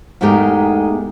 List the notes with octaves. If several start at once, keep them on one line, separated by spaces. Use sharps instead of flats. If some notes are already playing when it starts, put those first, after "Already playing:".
E2 G#2 G#3 A3 G4 A#4